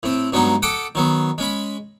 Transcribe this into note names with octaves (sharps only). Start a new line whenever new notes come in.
A2 C4
G2 F#3 G#3 B3 D#4
A4 F#5 G5 D6 D#6
D#3 F#3 B3
G#3 C#4 B5